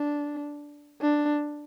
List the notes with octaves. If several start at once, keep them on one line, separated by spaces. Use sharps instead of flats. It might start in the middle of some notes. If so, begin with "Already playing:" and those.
Already playing: D4
D4